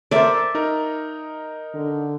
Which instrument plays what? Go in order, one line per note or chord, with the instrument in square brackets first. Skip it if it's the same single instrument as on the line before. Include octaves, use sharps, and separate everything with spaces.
[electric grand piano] A4 A#4 C5 [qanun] D5 E5
[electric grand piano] D#4 A#4
[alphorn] D3